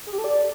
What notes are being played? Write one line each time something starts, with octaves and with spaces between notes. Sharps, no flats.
G#4
G4
A4
D5